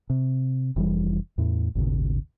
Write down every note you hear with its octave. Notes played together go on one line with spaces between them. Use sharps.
C3
F1 E3 G3
E2 A2
G#1 D#2 A#2 C#3